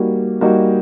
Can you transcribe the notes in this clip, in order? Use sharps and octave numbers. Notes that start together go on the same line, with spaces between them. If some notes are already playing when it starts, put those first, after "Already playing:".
Already playing: G3 A#3 D#4 F#4
G3 A#3 D#4 F#4